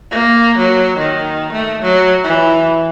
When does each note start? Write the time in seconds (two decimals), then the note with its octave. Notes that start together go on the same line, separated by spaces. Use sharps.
0.11 A#3
0.58 F#3
0.98 D#3
1.53 A3
1.83 F#3
2.24 E3